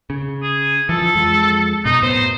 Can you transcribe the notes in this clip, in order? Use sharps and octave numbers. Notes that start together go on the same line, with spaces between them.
C#3
G#4
E3 F3 A4
F2 F3 G#3
F#2 B2 D#4
F#2 A2 B3 C5